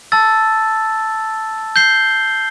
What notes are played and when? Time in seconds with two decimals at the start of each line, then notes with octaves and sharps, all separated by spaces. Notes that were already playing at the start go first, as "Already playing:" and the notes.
0.12 A5 E6 A6
1.76 G6 C7 G7